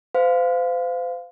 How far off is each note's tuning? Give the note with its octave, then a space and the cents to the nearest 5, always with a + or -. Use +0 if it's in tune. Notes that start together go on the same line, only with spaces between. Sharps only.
C5 -35 F5 +0